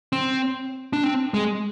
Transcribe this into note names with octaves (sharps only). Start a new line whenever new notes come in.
C4
D4
C4
G#3